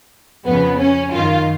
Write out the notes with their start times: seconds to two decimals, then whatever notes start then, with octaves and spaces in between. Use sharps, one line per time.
0.45 F2 C#3 B3
0.78 C#4
1.12 F#2 D#3 F4